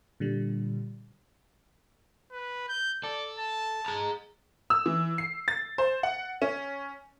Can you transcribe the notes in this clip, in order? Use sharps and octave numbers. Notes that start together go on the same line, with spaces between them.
A#2 D3 G3
B4
G6
A4 D5
A5
G#4 A#5
E6
E3
C7
A6
C5
F#5
C#4